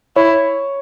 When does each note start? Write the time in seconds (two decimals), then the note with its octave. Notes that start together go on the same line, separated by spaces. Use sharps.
0.16 E4 C#5